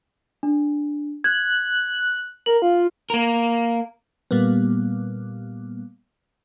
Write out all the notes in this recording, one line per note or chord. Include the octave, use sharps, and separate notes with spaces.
D4
F#6 G#6
A#4 F#7
F4
A#3 A#4
A#2 G3 A#3 B3